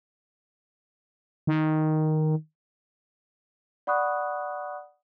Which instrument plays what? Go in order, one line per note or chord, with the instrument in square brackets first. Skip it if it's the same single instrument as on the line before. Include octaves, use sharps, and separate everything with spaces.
[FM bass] D#3
[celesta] D5 F#5 B5 C#6 D#6 F#6